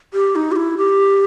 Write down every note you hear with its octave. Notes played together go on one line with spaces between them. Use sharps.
G4
D#4
G4
E4
G4